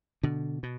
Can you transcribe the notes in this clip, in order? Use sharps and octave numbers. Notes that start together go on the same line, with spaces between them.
B2 D3
B2